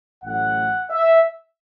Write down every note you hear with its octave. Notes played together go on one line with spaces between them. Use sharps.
A1 A2 F#3 A3 F#5
E5